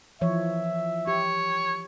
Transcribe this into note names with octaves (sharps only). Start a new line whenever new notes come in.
E3 F3 C#5 E5
G4 C#5